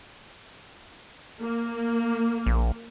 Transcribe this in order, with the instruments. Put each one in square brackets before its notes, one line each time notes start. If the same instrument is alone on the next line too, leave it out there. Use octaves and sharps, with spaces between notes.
[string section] A#3
[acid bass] A#1